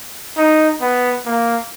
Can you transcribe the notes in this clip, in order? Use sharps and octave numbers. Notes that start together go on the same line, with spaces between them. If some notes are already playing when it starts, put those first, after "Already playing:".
D#4
B3
A#3